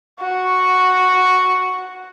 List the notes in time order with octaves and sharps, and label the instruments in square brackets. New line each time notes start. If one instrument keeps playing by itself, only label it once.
[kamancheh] F#4 [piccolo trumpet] C#6